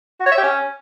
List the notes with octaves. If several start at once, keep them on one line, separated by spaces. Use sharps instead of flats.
F#4
C#5
E5
G4
C#4